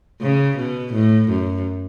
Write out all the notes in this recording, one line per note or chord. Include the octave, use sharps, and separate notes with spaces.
C#3
B2
A2
F#2